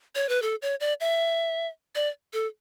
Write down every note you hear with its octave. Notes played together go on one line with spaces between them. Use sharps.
C#5
B4
A4
C#5
D5
E5
D5
A4